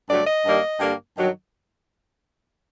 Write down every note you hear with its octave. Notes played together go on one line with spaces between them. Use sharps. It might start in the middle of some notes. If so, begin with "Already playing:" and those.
G2 D3 F#3 A3 D5
D#5
G2 D#3 G3 A#3
G2 D3 G3 A#3
G2 D#3 F#3